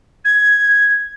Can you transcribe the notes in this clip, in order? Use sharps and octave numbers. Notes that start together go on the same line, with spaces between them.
G#6